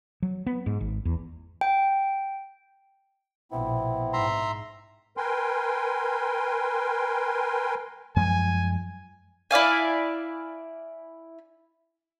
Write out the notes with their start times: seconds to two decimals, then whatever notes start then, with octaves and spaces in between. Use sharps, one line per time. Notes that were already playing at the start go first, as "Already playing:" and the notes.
0.22 F#3
0.47 B3
0.66 G#2
0.81 G#1
1.05 E2
1.61 G5
3.52 A#1 B2 B3 C4 E4
4.13 G#2 E5 A#5 C6
5.17 A#4 B4 G5 G#5 C6
8.16 F#2 F3 G#3 G#5
9.51 E4 D5 F5 G#5